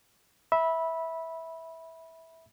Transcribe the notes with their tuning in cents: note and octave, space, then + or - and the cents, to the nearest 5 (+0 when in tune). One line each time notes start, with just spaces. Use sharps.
E5 -15 B5 -15